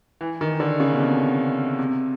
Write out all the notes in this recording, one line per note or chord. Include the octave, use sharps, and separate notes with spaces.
E3
D#3
D3
C#3
B2
C3
C3